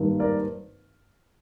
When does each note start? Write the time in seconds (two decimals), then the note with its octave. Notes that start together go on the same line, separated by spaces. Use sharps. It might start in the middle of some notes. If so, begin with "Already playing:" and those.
Already playing: G#1 G2 D#3 A#3
0.19 A#4 D5